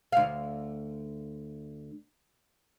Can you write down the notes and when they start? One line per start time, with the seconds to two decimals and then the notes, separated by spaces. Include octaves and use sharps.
0.12 D2 F5